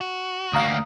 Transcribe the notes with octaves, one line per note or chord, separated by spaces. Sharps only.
F#4
D2 A#3 F5 A#5 D#6